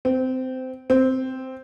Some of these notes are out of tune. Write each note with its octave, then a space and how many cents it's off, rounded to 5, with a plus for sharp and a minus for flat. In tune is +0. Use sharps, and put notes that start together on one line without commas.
C4 -20
C4 -5